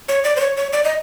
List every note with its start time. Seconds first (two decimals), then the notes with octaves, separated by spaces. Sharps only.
0.08 C#5
0.24 D5
0.36 C5
0.40 C#5
0.57 C#5
0.73 D5
0.84 D#5